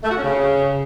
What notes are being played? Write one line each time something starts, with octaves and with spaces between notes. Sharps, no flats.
A3
F#4
C#4
C#3